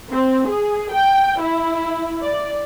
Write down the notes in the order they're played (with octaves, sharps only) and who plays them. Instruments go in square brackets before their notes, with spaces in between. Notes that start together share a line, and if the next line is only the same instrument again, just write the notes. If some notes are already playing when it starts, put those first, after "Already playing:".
[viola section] C4
G#4
G5
E4
D5